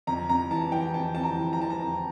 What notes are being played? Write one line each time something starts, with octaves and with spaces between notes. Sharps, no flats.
F2 A#5
F2 A#5
E3 A5
E3 G5
F2 A5
F2 A5
A#5
E3
A#5
E3 A5
A#5
F2